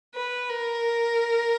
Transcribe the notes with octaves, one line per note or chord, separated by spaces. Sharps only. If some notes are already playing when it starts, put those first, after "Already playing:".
B4
A#4